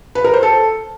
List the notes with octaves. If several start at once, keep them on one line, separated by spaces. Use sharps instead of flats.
B4
A#4
C5
A4